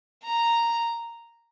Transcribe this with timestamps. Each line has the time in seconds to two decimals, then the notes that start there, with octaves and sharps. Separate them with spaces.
0.24 A#5